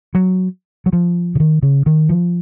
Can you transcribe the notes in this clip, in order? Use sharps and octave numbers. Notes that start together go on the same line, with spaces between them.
F#3
F#3
F3
C#3
D#3
C#3
D#3
F3